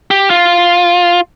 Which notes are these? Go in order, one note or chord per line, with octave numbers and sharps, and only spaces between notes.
G4
F4